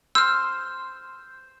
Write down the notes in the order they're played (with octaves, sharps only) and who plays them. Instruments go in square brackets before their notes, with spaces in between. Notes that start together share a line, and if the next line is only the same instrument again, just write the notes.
[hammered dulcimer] C5 [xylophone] E6 F6